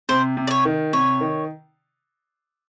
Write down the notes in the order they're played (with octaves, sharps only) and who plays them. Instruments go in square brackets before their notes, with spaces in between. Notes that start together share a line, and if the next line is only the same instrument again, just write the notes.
[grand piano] C3 [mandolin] C5
[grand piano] C3
[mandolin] D5
C#5
[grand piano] D#3
[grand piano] C3 [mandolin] C#5
[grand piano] D#3